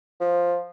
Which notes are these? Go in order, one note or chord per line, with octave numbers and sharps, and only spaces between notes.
F3